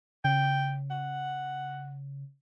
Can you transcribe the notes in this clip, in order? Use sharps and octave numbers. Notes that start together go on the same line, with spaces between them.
C#3 G5
F#5